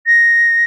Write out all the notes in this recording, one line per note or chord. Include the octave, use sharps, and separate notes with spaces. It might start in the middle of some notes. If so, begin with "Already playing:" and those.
A#6